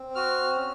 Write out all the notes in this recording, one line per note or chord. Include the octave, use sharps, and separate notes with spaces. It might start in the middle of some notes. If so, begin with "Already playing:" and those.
Already playing: C4
F#4 F6
C#4